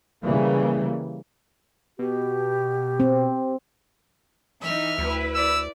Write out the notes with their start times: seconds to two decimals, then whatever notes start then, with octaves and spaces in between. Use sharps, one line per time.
0.23 C#3 E3 G3 A#3
1.99 B2 G4
3.00 C4
4.61 E3 D#4 E5 F6
4.98 D2 E4 B4
5.35 D5 E6